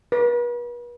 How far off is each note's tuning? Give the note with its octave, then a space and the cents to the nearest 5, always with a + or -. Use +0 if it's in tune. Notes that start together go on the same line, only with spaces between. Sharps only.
B4 -40